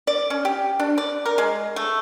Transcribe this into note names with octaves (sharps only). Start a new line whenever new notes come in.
D5
C#4
G4
D4
D5
A#4
G#3
A3